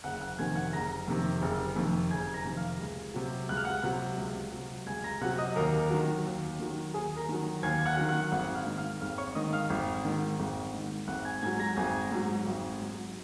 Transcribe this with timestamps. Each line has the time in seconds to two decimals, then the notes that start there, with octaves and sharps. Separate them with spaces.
0.04 F#1 F#5 F#6
0.21 F#5 F#6
0.39 F2 C3 D#3 G#5 G#6
0.55 F#5 F#6
0.73 F#1 A#5 A#6
1.08 F2 C3 D#3
1.42 F#1
1.76 F2 C3 D#3
2.11 F#1 G#5 G#6
2.34 A#5 A#6
2.45 F2 C3 D#3
2.57 F5 F6
2.80 C#2
3.14 C3 F#3
3.49 C#2 F#6
3.57 F6
3.64 F#5 F#6
3.83 C3 F#3
4.18 C#2
4.52 C3 F#3
4.87 C#2 G#5 G#6
5.04 A#5 A#6
5.21 C3 F#5 F#6
5.25 F#3
5.38 D#5 D#6
5.56 D#2 A#4 A#5
5.90 D#3 F#3
6.25 D#2
6.59 D#3 F#3
6.94 D#2 G#4 G#5
7.17 A#4 A#5
7.29 D#3 F#3
7.63 D#2 G#5 G#6
7.86 F#5 F#6
7.97 D#3 F#3
8.09 F#5 F#6
8.32 G#1 F#5 F#6
8.55 F5 F6
8.66 G#2 D#3
8.78 F5 F6
9.01 G#1 F5 F6
9.18 C#5 C#6
9.35 G#2 D#3 D#5 D#6
9.53 F5 F6
9.70 G#1
10.05 G#2 D#3
10.39 G#1
10.73 G#2 D#3
11.08 G#1 F#5 F#6
11.25 G#5 G#6
11.42 G#2 G#5 G#6
11.46 F#3
11.60 A#5 A#6
11.76 G#1 G#5 G#6
12.11 G#2 F#3
12.46 G#1
12.80 G#2 F#3